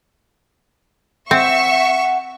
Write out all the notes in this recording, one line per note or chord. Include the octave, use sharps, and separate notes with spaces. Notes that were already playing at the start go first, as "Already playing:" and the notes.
C4 E5 F#5 C#6